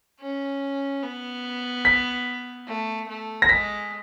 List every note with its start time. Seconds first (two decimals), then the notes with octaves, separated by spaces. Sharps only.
0.21 C#4
1.03 B3
1.85 B6
2.68 A3
3.08 A3
3.42 A#6
3.49 G#3 B6